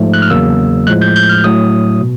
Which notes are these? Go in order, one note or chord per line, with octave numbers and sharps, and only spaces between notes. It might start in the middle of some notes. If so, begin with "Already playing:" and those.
Already playing: G#2 F3 A3
F#6
F6
E2 C#3 F#3 A#3 E6
A2 F3 G#3 F#6
G6
G6
F6
A2 F#3 A3 D#6
B2